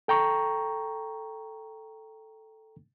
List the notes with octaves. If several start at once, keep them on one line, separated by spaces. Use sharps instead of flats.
A4 G5 A#5 C#6